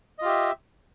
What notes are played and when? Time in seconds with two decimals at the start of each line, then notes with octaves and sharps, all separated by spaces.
0.19 D#5
0.22 F4
0.25 G4
0.28 E5